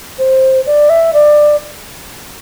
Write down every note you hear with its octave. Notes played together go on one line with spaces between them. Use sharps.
C5
D5
E5
D5